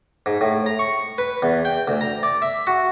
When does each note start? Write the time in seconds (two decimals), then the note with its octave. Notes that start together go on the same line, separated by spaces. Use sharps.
0.26 G#2
0.41 A2
0.66 A#5
0.79 C#6
1.18 B4
1.43 E2
1.65 G5
1.88 D2
2.01 A#5
2.23 D5
2.42 E5
2.67 F#4